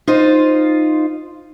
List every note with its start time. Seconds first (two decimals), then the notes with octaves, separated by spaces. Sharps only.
0.07 D#4 F4 C5